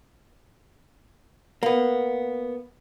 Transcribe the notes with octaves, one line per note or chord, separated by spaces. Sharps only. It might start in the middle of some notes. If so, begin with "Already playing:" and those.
A#3 B3